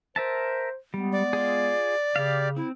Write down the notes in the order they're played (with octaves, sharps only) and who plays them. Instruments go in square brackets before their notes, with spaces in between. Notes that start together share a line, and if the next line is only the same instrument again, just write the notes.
[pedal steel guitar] A#4 E5 A5 [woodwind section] C5
[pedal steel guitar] G3 [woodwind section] G#3 B3
[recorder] D5
[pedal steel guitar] F4 G#4
[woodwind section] C#3 [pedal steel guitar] G4 F5
[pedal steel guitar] C4 [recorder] E4